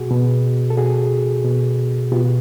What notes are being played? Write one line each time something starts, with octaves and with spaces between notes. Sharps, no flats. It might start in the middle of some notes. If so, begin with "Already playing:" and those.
Already playing: B2 F#4 G#4
B2
A4
B2 F#4 G#4
B2
B2 F4 G4